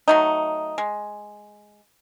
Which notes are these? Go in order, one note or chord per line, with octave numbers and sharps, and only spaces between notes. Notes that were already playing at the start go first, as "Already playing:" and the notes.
F#3 A3 D#4
G#3